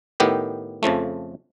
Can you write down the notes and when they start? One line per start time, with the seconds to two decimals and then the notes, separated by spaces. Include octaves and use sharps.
0.20 A2 D#3 B3 G4
0.83 F2 C#3 F3 A3